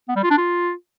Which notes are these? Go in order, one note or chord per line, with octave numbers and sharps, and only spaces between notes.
B3
G3
F4
D4
F4